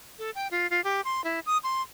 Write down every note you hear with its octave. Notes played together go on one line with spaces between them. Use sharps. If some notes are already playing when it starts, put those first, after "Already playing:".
A4
G5
F4
F4
G4
C6
E4
D#6
C6